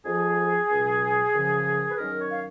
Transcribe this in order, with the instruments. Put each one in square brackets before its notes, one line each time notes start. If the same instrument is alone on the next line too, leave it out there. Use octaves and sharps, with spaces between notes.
[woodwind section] F2 F3 G#4
C#2 B2 F#3
F#2 C#3 F3
B4
F#2 D#3 F#3 A#4
C#5
F5